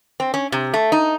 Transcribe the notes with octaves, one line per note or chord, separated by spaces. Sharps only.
C4
C#4
C3
A3
D#4